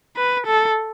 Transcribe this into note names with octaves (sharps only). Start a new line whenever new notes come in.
B4
A4